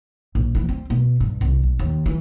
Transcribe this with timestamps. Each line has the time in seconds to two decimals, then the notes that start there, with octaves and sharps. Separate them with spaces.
0.35 A#1
0.55 E3
0.69 C4
0.90 B2
1.20 G2
1.41 C2
1.63 B1
1.79 D#2
2.06 E3